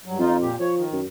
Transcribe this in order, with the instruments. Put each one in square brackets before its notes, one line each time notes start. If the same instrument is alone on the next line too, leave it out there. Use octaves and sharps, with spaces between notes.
[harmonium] G2 F#3
[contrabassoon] F2 [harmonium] D#4 F4
[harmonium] A#2 G4
[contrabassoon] F3 [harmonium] C#5
[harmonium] D#3
[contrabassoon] F#2